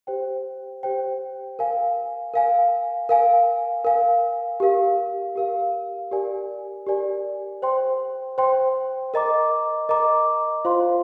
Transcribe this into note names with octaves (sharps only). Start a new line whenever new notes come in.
G4 C5 G5
G4 C5 G5
A#4 F5 G#5
A#4 F5 G#5
A#4 F5 G#5
A#4 F5 G#5
G4 A#4 F5
G4 A#4 F5
G4 A#4 D5 G#5
G4 A#4 D5 G#5
C5 G5 C6
C5 G5 C6
A#4 D#5 A#5 D6
A#4 D#5 A#5 D6
F4 C5 F5 C6